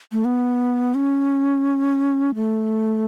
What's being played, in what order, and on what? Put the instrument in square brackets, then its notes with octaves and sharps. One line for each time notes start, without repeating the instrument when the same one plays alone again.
[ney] A3
B3
C#4
A3